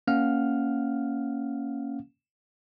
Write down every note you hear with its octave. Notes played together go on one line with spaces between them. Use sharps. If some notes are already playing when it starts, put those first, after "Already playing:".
A#3 C#4 F5 F#5 F6